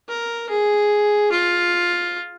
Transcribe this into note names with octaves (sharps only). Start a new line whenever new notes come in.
A#4
G#4
F4